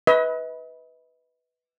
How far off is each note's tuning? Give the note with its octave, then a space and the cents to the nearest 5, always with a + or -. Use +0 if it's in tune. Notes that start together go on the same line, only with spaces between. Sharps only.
B4 +0 D#5 +45